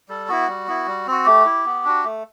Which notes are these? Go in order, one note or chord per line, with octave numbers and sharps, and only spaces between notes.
G3 A4
B3 E4 F#4
G3
B3 E4
G3
C4 F#4
A3 G4
E4
B3
D4 F#4
A3